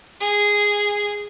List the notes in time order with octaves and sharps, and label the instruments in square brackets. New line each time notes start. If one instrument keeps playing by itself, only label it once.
[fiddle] G#4